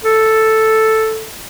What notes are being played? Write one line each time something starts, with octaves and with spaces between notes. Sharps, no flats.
A4